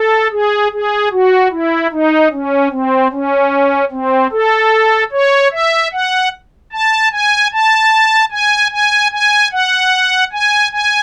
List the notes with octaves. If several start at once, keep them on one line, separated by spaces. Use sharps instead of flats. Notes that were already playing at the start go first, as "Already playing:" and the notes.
Already playing: A4
G#4
G#4
F#4
E4
D#4
C#4
C4
C#4
C4
A4
C#5
E5
F#5
A5
G#5
A5
G#5
G#5
G#5
F#5
G#5
G#5